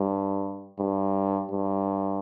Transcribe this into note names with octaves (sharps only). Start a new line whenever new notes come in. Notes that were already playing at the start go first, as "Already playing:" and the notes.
Already playing: G2
G2
G2